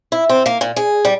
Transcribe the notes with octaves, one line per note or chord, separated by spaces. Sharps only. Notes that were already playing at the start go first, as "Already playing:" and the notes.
E4
C4
A#3
A#2
G#4
G3